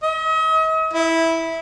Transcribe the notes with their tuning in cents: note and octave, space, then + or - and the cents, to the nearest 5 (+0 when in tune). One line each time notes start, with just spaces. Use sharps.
D#5 +40
E4 -10